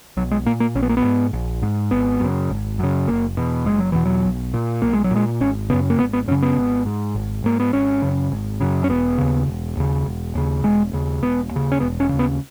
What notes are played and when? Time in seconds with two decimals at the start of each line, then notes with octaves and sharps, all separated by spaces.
0.17 B1 F#3
0.31 G#3
0.46 A#2 A#3
0.60 A#3
0.75 A#1 C#4
0.82 B3
0.89 A#3
0.97 B3
1.04 G#2
1.33 A#1
1.62 G#2
1.91 G#1 B3
2.20 F#2 C#3
2.50 G#1
2.79 F#2 C#3
3.08 F#1 A#3
3.37 E2 B2
3.66 F#1 G#3
3.79 F#3
3.92 E2 B2 E3
4.05 F#3
4.25 B1
4.54 A#2
4.82 B1 A#3
4.93 G#3
5.04 F#3
5.11 A#2 G#3
5.40 G#1 C#4
5.70 C#3 B3
5.73 F#2
5.90 A#3
5.98 G#1 B3
6.13 B3
6.28 F#2 C#4
6.31 C#3
6.42 B3
6.57 G#1
6.86 G#2
7.15 G#1
7.44 G#2 A#3
7.60 B3
7.73 G#1 C#4
8.02 F#2 C#3
8.32 G#1
8.60 F#2 C#3
8.84 C#4
8.89 E1 B3
9.18 D#2 C#3
9.48 E1
9.77 D#2 C#3
10.06 E1
10.35 D#2 C#3
10.64 E1 G#3
10.93 D#2 C#3
11.22 E1 B3
11.51 D#2
11.56 C#3
11.72 C#4
11.80 E1 B3
12.00 C#4
12.09 D#2 C#3
12.19 B3